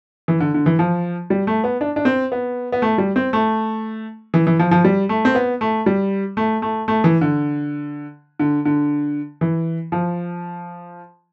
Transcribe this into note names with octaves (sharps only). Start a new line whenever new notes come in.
E3
D3
D3
E3
F3
G3
A3
B3
D4
D4
C4
B3
B3
A3
G3
C4
A3
E3
E3
F3
F3
G3
A3
C4
B3
A3
G3
A3
A3
A3
E3
D3
D3
D3
E3
F3